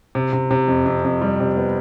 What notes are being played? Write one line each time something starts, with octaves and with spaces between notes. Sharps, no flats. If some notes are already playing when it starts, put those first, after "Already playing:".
C3
C3
C3
F2
F2
F2
G3
C3
B3